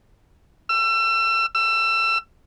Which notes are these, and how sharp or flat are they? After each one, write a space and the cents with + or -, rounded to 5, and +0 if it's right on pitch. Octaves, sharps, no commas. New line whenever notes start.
E6 +35
E6 +30